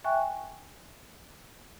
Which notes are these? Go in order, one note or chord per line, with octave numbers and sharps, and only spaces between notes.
E5 G5 G#5 C#6 F#6